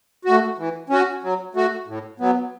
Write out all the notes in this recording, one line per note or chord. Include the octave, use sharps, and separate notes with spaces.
A3 F#4
E3
C#4 F#4
F#3
A3 F#4
A2
F#3 B3